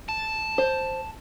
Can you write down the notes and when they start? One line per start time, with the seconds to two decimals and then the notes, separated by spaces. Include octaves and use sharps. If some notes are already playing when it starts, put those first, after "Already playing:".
0.09 A5
0.58 C5